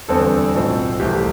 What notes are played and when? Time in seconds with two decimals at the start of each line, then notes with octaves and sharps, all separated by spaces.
0.09 E2 D3 G3 C4 A4
0.54 B1 A2 F3 C4
1.00 C2 C3 E3 A3 G4